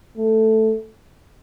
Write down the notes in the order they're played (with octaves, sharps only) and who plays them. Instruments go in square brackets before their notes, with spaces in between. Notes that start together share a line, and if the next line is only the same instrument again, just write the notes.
[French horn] A3